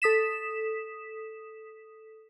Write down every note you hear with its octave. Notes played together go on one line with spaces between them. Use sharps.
A4 D#6 B6 E7